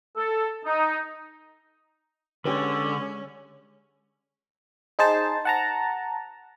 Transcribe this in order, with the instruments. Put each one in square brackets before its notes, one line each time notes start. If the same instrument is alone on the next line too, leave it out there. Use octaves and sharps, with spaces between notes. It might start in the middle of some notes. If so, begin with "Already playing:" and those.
[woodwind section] A4
D#4
[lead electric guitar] D3 [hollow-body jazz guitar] G#3 G4 B4 [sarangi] C#4
[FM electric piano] D#4 G#4 C5 A5
F#5 A5 A#5